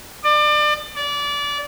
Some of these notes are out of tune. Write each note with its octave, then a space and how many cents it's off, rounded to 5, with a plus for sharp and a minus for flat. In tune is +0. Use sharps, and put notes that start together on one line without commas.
D5 +30
D5 -25